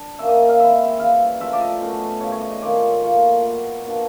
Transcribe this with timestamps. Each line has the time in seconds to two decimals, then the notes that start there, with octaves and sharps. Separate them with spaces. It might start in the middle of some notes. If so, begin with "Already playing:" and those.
Already playing: D4
0.19 F#3 A#3 C#4 E5
0.29 D#5
0.49 F5
0.59 D#3 G#3 C4 E4 E5
0.99 C#3 E3 G3 F5
1.40 C#3 F3 A3 E5
1.53 D5
1.61 D#5
1.81 B2 F#3 A3 C#4
2.20 C#3 E3 G3 C#5
2.31 C#5
2.41 D#5
2.51 D#5
2.61 D#3 G#3 C4 F4 D5
2.81 C#5
3.02 A2 F3 A#3 C#5
3.42 A#2 F#3 B3
3.83 B2 F#3 A#3 D4